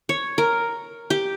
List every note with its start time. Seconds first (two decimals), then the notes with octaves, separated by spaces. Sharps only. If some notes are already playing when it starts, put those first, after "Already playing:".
0.09 C#5
0.38 A#4
1.10 G4